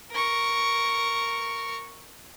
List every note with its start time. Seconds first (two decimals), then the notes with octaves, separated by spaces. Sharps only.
0.12 A#4 C#6